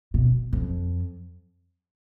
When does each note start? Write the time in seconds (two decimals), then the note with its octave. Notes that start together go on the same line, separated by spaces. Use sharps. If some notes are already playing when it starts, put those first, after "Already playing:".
0.14 B2
0.53 F2